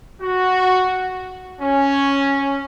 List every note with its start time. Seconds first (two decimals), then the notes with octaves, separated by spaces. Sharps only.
0.21 F#4
1.60 C#4